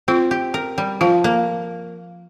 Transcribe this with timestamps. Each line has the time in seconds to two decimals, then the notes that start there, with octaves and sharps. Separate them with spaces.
0.08 C4 F4
0.31 G4
0.54 A#4
0.78 G3
1.01 F3 F4
1.24 A#3